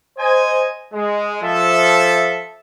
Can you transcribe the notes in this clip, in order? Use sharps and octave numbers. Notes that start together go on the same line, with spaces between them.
C5 D#5 G#5
G#3
F3 A4 E5